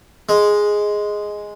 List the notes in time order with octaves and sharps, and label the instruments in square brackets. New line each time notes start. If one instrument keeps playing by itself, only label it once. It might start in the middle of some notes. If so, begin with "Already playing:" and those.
[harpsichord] G#3